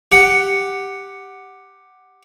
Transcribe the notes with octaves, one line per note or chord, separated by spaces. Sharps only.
G4 F#5